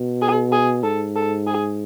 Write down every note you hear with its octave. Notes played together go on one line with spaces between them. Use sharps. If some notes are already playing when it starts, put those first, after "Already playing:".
Already playing: B2
G#4
G#4
G#2 A4
A4
G#4